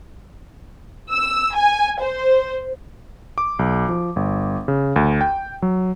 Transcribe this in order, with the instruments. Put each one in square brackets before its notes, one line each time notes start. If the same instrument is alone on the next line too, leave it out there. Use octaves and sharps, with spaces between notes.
[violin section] E6
G#5
C5
[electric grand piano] D6
B1
F3
G1
C#3
D2
G5
F#3